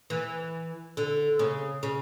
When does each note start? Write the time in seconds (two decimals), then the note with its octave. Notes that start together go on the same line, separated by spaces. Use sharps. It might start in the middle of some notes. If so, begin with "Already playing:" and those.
0.10 E3
0.97 D3
1.39 C#3
1.83 C#3